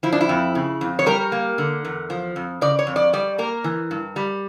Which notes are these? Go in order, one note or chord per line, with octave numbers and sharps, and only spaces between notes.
F3 E4
D4
E4
F2
C#3
F2
C#5
G3 A#4
A#3
D3
E2
F3
F2
C#3 D5
C#5
F2
D5
G3 D5
A#3 A#4
E3
G2
G3